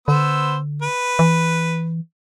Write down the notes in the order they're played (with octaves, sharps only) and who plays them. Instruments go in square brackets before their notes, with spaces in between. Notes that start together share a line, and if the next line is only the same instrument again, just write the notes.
[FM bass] D3 [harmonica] B3 C5 E6
[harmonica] B4
[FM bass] E3